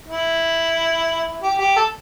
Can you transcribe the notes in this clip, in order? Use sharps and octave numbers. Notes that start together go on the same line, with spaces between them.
E4
G4
G4
A4